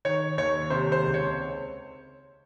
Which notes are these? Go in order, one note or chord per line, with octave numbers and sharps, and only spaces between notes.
D#3 C#5
D#2 C#5
C3 C5
C5
C#2
C#5